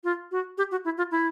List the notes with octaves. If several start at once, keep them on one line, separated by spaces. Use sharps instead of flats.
F4
F#4
G4
F#4
E4
F4
E4